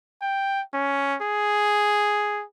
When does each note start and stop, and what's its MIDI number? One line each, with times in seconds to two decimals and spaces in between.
0.22 0.62 79
0.73 1.16 61
1.22 2.44 68